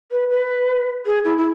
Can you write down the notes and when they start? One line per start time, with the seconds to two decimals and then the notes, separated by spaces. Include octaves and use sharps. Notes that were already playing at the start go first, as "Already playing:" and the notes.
0.11 B4
0.30 B4
1.06 G#4
1.25 E4
1.38 E4